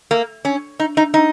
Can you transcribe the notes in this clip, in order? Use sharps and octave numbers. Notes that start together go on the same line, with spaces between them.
A#3
C#4
D#4
D#4
D#4